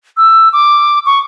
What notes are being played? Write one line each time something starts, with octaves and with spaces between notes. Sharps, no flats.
E6
D6
C#6